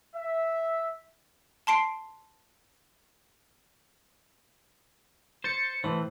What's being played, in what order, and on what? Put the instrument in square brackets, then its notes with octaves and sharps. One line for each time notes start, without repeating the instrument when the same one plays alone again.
[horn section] E5
[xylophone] A5 C6 C7 D7
[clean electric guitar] C5 [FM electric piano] G6 A6 C#7
[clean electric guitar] A2 E3 [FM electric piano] C5